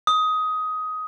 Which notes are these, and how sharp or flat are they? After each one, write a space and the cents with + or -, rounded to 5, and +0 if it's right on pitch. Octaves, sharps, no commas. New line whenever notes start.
D#6 +15